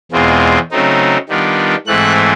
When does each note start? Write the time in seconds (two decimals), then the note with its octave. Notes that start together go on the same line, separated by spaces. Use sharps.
0.12 E2 B2 G#3 C4 F4
0.71 C#3 F#3 A3 C4 D#4
1.29 D#3 G3 B3 D4 F4
1.87 G#2 E3 A3 C4 E4 F#6